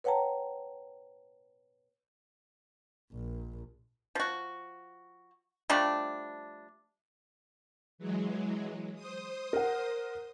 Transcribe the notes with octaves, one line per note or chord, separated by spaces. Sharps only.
B4 C#5 F#5 G5 A5 A#5
A#1
F3 F#4
F3 G3 A3 D4
E3 F#3 G#3
C5 D#6
A#4 F#5